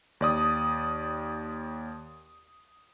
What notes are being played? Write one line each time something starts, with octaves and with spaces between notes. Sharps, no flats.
D#2 D5 D#6